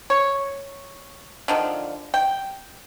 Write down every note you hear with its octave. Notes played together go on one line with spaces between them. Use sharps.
C#5
D3 D#3 F3
G5